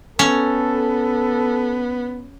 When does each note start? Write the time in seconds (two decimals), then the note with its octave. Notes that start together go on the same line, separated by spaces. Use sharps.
0.19 B3 C#4 A4